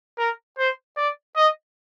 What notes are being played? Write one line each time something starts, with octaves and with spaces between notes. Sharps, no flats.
A#4
C5
D5
D#5